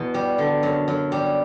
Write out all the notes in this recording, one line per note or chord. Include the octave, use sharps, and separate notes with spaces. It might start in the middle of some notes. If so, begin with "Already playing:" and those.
Already playing: E2 B2
G3
D3
F#2
F#2
G3